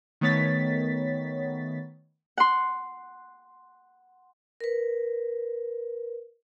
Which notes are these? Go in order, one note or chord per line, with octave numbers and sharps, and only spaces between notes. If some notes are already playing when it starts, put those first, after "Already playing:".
D#3 A3 B3 C#5 A6 B6
F#5 C6
A#4 B4